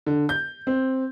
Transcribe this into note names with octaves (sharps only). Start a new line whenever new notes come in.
D3
G6
C4